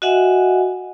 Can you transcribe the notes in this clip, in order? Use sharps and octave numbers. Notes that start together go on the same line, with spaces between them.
F#4 D#5 E5 F#5 G#5